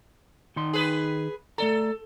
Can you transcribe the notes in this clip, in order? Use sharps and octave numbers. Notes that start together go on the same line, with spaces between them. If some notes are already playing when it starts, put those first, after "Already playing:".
D#3 D#4 C6
G#4 B4
A3 A4 D5 A#5